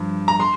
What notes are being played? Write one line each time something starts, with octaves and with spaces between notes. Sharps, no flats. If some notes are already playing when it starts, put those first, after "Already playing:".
Already playing: G2 F3
A#5
C6